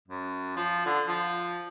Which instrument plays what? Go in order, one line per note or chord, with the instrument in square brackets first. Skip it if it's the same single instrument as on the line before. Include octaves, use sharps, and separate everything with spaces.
[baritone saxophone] F#2
F3
D3
F3